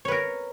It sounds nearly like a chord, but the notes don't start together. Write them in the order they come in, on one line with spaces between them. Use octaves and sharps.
C#5 B4 A#4